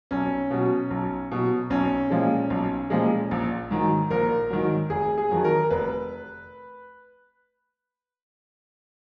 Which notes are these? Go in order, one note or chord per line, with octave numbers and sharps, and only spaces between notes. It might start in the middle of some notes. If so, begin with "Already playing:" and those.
B1 C#4
B2 F#3
B1
B2 F#3
B1 C#4
A#2 F3 G#3
B1
A#2 F3 G#3
A#1
G#2 D#3 F#3
A#1 A#4
G#2 D#3 F#3
F1 G#4
G#4
F2 D#3 F#3
A#4
F1 B4